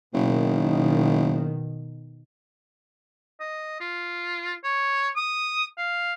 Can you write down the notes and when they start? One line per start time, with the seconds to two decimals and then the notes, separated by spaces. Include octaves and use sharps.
0.14 F#1 B2 D#3
3.40 D#5
3.80 F4
4.64 C#5
5.16 D#6
5.78 F5